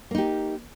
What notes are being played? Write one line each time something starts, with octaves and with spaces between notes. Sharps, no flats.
A#3 D#4 G4